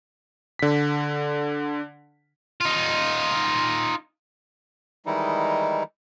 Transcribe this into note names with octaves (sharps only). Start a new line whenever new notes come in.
D3 B6
D#4 F4
D#3 E3 G3 G#3 D#4 E4